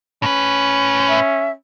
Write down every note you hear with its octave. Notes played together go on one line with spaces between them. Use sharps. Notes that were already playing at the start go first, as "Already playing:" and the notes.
A2 C#4 B4
E5